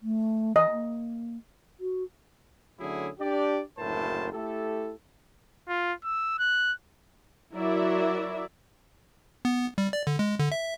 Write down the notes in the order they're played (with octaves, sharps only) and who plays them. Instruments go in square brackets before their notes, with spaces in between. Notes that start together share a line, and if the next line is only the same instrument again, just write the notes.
[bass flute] A3
[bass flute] E3 [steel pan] D#5
[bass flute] A#3
F#4
[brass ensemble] D3 F#3 A3 C#4 E4 G#4
D4 G4 D5
F#1 D2 A2 A#4 C5 A5
A3 E4 G4 A4
[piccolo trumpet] F4
E6
F#6
[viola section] F#3 E4 A#4 D5 E5
[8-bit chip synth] B3
G3
D5
D3
G#3
D3
E5